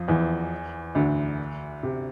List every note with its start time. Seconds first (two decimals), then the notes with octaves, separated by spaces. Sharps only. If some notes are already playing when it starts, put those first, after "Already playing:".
Already playing: F2 F3
0.08 E2 E3
0.95 D2 D3
1.83 C3